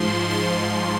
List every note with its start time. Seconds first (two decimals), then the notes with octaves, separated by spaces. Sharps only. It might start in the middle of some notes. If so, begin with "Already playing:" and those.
Already playing: G#2 F3 C6
0.31 C6